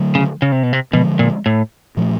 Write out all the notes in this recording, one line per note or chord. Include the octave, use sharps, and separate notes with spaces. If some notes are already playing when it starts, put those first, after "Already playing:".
Already playing: D3 F#3 A3
C#3
C#3
C3
B2
C3
B2 D3 F3 G#3
A#2
A2
A#2 F3 A3